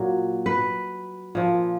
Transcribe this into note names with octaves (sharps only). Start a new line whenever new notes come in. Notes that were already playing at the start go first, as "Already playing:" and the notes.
Already playing: A#2 F#3
B4
A#2 F3